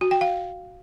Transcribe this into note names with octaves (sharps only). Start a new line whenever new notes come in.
F#4
G5
F5